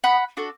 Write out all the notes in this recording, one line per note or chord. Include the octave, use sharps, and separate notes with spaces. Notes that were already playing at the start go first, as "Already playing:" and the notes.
B3 F#5 B5
D4 F#4 A4